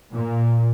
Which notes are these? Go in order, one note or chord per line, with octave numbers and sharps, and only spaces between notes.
A#2